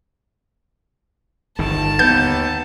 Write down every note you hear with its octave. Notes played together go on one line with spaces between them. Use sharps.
G1 D#3 A5
D#2 B3 G6